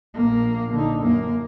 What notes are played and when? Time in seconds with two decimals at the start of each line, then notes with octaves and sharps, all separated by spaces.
0.15 A#1 A#3
0.74 D3 D#4
1.03 F#2 A#3